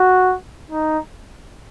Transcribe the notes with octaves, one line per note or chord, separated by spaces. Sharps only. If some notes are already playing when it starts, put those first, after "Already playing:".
Already playing: F#4
D#4